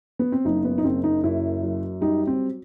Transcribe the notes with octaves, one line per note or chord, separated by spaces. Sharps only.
B3
C4
F#1 D#4
B3
D#4
F#1 C4
D#4
F#2 E4
F#3
G3 D#4
C4